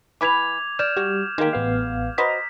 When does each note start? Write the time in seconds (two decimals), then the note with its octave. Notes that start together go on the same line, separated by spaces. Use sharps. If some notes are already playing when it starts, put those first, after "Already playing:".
0.21 E3 E4 B4 D6 G#6 F7
0.79 D5 F6 G6 E7
0.96 G3 F#4
1.38 D#3 G#3 A#3 G4
1.53 A1 B3 F5
2.18 F#4 B4 C5 D#5 A#5 B6